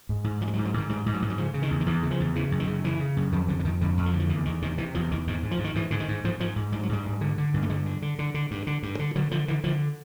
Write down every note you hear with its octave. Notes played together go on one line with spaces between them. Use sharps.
G#2
G#2
G#2 F3
G3
F#3
G#2
F#3
G#2 D#3
G#2 G3
G#2
F#3
G#2
F#3
C#3 F3
C#3
D#3
E2
D#3
E2 E3
C#3
F3
E2
C#3 E3
F#2
D#3
C#3
C#3 E3
C#3
F#2
F2 D#3
F2 D3
D3
F2 D#3
F2 D3
F2
F3
D3
F3
E2 E3
E2 D#3
C3 D#3
C3 E3
E2 F3
E2 D#3
G#2 D#3
G#2
F3
G#2
D#3
G#2 E3
G#2 D3
D#3
G#2
G#2 F3
G#2 F3
G#2
G#2 G3
F#3
G#2 G3
G#2
D3
D3
G2
A3
D3 G#3
D3
D3
D3
D3
G2
D3
G2
D3
D3 F#3
D3 F3
D3 E3
D3 F3